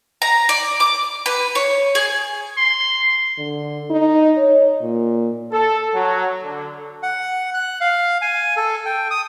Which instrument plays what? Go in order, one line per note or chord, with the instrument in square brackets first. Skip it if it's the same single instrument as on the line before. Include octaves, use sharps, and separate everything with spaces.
[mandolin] A#5
D5
D6
B4
C#5
G#4
[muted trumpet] C6
[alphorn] D3
D#4
C#5
A#2
[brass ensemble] A4
F#3
D3
[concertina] F#5
F#6
F5
G#5
A4
G5
D#6